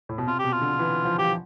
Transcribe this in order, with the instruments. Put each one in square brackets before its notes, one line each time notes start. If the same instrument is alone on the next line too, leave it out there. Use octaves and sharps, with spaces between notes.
[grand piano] A2
B2
[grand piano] C3 [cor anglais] F4
[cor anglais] G4
[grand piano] B2
[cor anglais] F4
[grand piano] D3
D3
E3
F3
[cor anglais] G4
[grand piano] F3